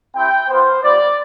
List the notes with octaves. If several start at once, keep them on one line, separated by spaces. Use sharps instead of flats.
C4 E4 G4 G5
B3 F4 C5
G3 B3 F4 D5